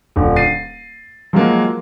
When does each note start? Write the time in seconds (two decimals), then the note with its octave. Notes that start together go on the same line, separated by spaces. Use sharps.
0.16 D#1 D3
0.36 A6 C7 D#7
1.33 F3 F#3 G#3 A#3 F#4